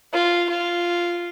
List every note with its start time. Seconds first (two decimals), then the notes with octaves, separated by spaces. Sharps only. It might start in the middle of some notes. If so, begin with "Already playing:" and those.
0.13 F4
0.49 F4